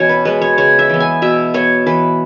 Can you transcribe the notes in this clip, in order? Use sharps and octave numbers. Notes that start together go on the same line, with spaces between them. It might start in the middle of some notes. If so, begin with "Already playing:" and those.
Already playing: B2 E3 C#4 C#5
B4
G#3 B3 B4
C#5
C#3 C#5
E5
E3 B3
G#5
B2 E5
B3 C#5
E3 B4